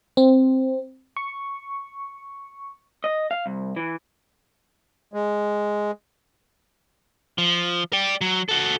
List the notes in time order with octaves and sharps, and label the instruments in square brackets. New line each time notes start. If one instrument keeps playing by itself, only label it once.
[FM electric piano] C4
C#6
[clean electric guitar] D#5
F5
C2
E3
[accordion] G#3
[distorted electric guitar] F3
D5 G5
F#3
F#4 A4